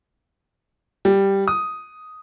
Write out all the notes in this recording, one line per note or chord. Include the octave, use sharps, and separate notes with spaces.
G3
D#6